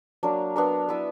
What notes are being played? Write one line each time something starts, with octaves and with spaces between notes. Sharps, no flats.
F#3 A#3 D4 A#4
B3 D4 A#4
B3 E4 B4 E5